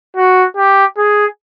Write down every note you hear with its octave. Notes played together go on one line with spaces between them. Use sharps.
F#4
G4
G#4